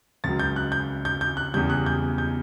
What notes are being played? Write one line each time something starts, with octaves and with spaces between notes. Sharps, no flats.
C#2 C#3 F#3 A6
G6
F#6
G6
G6
G6
F#6
E2 C#3 G3 G6
F#6
G6
G6